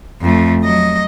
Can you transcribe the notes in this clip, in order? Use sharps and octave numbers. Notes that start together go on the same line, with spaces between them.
F2 A3
F#3 D#5